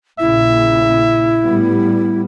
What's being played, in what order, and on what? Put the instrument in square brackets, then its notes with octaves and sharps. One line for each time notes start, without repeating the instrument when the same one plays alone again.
[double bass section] A#1 A#2 C#3 [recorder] E4 [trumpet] E5
[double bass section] A2 G3 B3